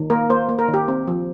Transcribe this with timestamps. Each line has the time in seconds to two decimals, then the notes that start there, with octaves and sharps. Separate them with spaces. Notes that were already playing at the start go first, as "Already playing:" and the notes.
Already playing: D#3
0.10 A#3 A#4
0.30 A#3 C5
0.49 A#3
0.59 A#4
0.68 D#3
0.74 G4
0.88 C4
1.07 F3